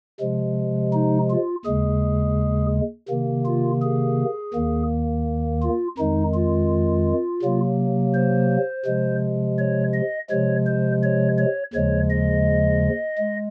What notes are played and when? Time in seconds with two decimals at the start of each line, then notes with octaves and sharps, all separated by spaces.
0.21 C3 F3 G#3
0.93 D#4
1.30 F4
1.65 D#2 C#3 G#3 G#4
3.09 C3 D#3 A#3
3.45 F4
3.82 G#4
4.54 D#2 D#3 A#3
5.62 F4
5.98 F2 D#3 G#3 D#4
6.34 F4
7.43 C3 F#3 A#3
8.14 C5
8.86 C3 F3 G#3
9.58 C#5
9.94 D#5
10.30 C3 F3 G#3 C#5
10.66 C5
11.03 C#5
11.38 C#5
11.74 D#2 C#3 F3 G#3 C#5
12.10 D#5
13.18 G#3